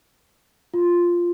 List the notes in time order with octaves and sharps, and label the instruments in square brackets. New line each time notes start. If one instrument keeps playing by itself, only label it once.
[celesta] F4